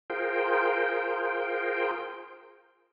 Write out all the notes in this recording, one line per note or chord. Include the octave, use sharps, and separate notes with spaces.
F4 G#4 A#4 C5 G5